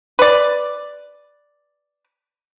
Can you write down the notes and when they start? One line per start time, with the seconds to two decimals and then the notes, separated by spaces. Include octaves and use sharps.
0.19 B4 D5